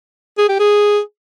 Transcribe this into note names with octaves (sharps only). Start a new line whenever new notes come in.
G#4
G4
G#4